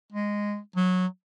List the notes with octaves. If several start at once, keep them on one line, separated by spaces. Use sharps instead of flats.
G#3
F#3